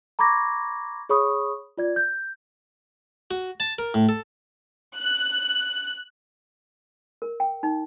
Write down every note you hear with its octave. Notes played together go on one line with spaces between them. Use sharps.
A#5 B5 C#6 D6 G#6 A#6
G#4 C#5 B5 C#6 D#6
F4 D5 G#6
G6
F#4
A5
A#4
A2
A4
F#6
A#4
G5
D#4